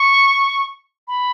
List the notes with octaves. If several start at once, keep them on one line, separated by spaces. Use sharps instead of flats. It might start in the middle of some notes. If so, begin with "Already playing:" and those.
Already playing: C#6
B5